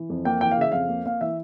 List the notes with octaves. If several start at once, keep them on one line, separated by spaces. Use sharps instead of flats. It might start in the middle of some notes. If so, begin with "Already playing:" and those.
Already playing: E3
F2
A#3 G5
E3 G5
F5
C#3 E5
F2 F5
A#3
A#3 F5
E3 E5